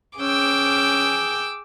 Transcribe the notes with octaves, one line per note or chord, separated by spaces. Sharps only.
C#4 G#4 G5 D6 E6